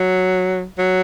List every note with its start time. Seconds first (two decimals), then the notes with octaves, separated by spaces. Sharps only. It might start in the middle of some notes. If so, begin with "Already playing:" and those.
Already playing: F#3
0.79 F#3